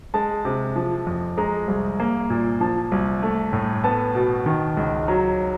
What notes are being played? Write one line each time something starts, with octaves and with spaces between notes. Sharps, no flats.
G#3 A5
C3
F3
F2
G#3 A#5
C2
A#3
A#2
F3 A5
C2
A3
A2
B3 A5
B2
D#3
C#2
F#3 A#5